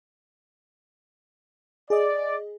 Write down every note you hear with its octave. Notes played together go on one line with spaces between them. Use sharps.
G#4 D5 D#5